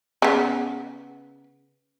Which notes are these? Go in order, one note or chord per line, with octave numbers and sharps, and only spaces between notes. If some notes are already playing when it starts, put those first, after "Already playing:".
C#3 B3